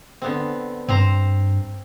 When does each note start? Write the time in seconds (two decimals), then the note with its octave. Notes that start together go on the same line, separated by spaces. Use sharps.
0.22 D3 B3 C4
0.89 G2 C4 C5 A#5